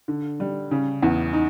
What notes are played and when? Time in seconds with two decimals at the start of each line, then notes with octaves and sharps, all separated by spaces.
0.08 D3
0.40 G3
0.71 C#3
1.02 E2
1.33 D#4